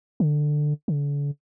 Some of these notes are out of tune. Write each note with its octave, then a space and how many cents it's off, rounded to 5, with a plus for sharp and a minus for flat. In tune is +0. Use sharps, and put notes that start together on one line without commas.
D3 +15
D3 -40